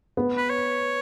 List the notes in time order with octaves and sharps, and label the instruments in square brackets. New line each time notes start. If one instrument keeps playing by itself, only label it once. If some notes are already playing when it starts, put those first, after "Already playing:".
[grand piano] B3
[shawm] B4
C#5